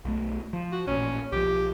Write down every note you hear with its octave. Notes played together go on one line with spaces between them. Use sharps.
B1 A3
F3
F#4
A1 A#2 C#4
B1 F3 G4